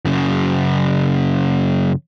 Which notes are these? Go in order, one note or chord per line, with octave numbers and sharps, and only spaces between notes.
F#2 C#3